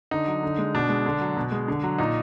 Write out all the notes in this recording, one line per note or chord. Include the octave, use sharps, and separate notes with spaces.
D3 D#4
F#3
D3
G#3
B2 D4
G#3
D3
F#3
B2
G#3
D3
F#3
A#2 D#4